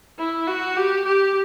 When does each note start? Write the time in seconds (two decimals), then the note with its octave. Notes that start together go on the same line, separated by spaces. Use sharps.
0.19 E4
0.48 F#4
0.77 G4
1.05 G4